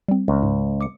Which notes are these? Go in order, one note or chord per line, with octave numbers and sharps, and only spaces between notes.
G3 C4
C#2
G#2
D6 D#6 C#7